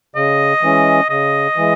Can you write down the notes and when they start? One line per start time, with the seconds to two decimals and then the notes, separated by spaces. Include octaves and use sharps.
0.16 C#3 D#5
0.62 E3 G#3 C#4
1.10 C#3 D#5
1.56 E3 G#3